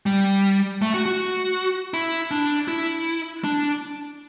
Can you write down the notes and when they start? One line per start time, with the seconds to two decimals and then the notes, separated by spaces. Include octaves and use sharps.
0.06 G3
0.82 A3
0.94 F#4
1.06 F#4
1.94 E4
2.31 D4
2.68 E4
3.44 D4